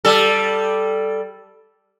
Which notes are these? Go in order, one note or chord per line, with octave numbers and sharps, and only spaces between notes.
G3 A4